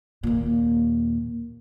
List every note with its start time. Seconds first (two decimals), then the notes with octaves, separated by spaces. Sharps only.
0.23 D#2 A#2